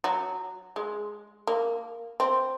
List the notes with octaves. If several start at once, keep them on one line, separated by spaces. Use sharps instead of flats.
F#3
G#3
A#3
C4